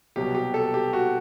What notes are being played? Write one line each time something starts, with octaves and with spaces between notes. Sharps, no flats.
C2 B2 F#3 G4
G4
A4
G4
F#4